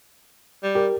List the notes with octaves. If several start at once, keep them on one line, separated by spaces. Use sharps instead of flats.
G3
G4 A#4